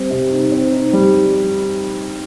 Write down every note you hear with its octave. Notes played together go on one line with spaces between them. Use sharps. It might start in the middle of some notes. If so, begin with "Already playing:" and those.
Already playing: G3 C4
C3
D#4
C4
D#4
G3